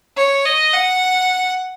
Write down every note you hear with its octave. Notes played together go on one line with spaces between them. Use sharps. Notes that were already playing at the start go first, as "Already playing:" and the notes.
C#5
D#5
F#5